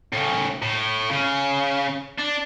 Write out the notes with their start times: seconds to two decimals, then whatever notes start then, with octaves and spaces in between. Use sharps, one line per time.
0.13 A2 C#3
0.62 A2
1.10 C#3
2.19 D4